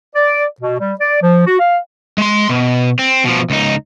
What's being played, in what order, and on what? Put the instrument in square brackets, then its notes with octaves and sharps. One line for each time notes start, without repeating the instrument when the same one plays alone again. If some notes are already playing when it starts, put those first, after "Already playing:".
[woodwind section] D5
B2
G3
D5
F3
F#4
F5
[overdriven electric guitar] G#3 C6
B2
C4
B2 F3
C#2 D#4